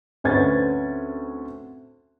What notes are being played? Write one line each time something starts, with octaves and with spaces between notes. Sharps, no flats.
D2 C4 C#4 B4 G#6 A6